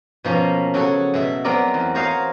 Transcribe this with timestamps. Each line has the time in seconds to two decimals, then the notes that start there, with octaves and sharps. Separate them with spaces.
0.24 B2 F3 A#3 C#4
0.74 C#3 F#3 F#4 A4 C#5
1.14 B2 G#3 E5
1.45 F#3 A3 B3 C4 A#4 D5
1.74 E2
1.95 F#4 A#4 C5 C#5 D#5 F5